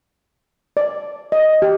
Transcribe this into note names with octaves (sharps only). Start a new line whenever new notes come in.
D5
D#5
G4